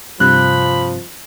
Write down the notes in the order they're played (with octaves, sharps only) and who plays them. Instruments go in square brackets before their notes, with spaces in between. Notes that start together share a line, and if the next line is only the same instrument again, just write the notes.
[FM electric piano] G2 C3 [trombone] F3 [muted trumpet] B5 [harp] F#6 G6